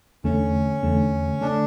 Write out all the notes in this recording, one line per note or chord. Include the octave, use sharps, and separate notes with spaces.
E2 D3 A3 C#4
E2 D3 A3
D3 A3 D4